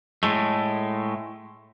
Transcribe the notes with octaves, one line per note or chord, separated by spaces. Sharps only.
A2 G#3 A3